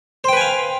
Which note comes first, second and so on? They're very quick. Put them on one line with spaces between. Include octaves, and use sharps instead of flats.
C5 G5 B4 G#5 F5